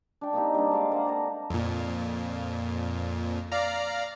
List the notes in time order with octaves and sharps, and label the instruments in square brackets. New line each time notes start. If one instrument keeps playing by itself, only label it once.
[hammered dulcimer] D4 G5
A#3 C4 D#4 G4
G3 A#3 D4
G#3 F5 D6
A#3 F#5
A4 C5 A#5
[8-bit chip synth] F2 A#2
D5 F5 A#5